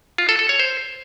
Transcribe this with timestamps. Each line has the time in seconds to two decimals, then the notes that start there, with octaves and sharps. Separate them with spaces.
0.18 F4
0.29 A4
0.39 A4
0.49 C#5
0.59 C5